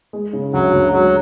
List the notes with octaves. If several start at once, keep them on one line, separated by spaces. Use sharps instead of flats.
G#3
C#3
D2 F#3
D2
F#3 G#3